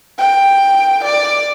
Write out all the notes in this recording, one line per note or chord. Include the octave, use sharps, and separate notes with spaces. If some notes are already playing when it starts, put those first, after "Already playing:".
G5
D5